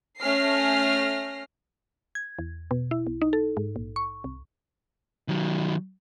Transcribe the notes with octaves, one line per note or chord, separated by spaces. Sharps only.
A3 C#4 F6 A#6 C7
G#6
E2
B2
E4
B1
D#4
A4
G#2
A#1
C#6
C2
D#3 F#3